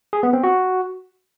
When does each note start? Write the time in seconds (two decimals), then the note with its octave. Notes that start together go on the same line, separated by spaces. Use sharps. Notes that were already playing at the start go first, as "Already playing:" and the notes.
0.13 G#4
0.23 B3
0.33 C4
0.44 F#4